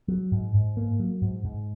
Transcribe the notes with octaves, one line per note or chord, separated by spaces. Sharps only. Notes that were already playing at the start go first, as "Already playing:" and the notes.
F#3
G#2
G#2
A#3
F#3
G#2
G#2